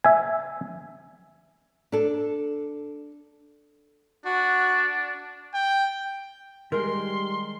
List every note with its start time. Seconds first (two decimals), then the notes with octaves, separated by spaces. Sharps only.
0.04 E5 G#5
1.92 D4 A4
4.26 D4 F#4
5.54 G5
6.72 D#3 G3 G#3 A#4 C6